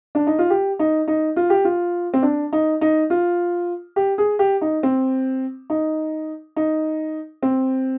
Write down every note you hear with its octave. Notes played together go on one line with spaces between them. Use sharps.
D4
D#4
F4
G4
D#4
D#4
F4
G4
F4
C4
D4
D#4
D#4
F4
G4
G#4
G4
D#4
C4
D#4
D#4
C4